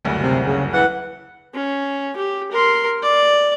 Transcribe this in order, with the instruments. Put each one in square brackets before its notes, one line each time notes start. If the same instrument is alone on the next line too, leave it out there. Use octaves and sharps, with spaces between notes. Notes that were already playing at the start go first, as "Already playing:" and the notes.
[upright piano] F#1 D2 G2
[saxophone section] C3
C#3
E3 F#5
[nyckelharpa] C#4
G4
A#4 C6
D5